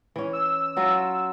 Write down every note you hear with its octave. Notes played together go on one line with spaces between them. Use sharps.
E3 C#4
E6
F#3 F4 F#4